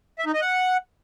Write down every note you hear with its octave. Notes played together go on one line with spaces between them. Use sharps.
E5
D#4
D#5
F#5